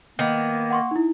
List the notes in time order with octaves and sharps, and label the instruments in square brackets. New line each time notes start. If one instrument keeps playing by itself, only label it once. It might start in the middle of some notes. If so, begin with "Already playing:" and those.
[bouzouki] D#3 B3 [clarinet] A#3
[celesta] F#5 C6 C#6
D#4 E4